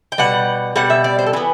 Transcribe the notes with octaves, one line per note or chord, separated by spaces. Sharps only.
G5
B2 G3 F#5
B2 G3 F#5
E5
D5
C5
A4
E3 B3 B4